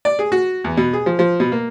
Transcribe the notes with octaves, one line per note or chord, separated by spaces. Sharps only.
D5
G#4
F#4
E2
B2
G#4
F3
F3
B2
A#3